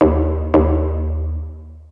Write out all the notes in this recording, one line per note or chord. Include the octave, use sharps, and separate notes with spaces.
D#2
D#2